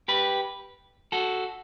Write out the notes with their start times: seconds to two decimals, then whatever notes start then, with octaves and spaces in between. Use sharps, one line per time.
0.08 G4 B4
1.12 F#4 A4